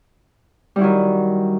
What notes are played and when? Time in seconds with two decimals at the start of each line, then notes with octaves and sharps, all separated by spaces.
0.76 G3
0.78 E4
0.81 F#3
0.84 D#3